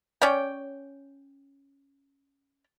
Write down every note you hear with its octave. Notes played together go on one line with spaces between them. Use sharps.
C#4 C#5 D5 G5